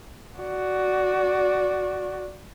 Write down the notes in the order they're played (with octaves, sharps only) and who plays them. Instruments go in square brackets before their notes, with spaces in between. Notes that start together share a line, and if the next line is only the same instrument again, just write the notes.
[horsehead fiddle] F#4 D5